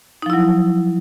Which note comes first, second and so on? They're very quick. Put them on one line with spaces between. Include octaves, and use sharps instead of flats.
D#4 F3 E4 F#3